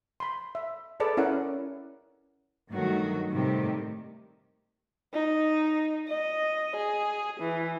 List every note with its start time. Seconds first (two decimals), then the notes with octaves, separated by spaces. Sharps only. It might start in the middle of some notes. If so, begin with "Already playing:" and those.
0.20 B5 C6
0.55 E5
1.00 G#4 A4 B4 D5 A5
1.17 C#4 E4 A#4 F#5
2.71 G2 D#3 F#3 A3 D#4 F#4
3.32 A2 C3 D#3 G3 G4
5.14 D#4
6.08 D#5
6.77 G#4
7.40 E3